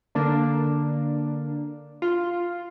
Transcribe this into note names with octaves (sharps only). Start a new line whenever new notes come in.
D3 A#3 D4
F4